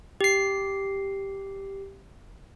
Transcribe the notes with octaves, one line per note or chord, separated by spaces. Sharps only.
G4 C7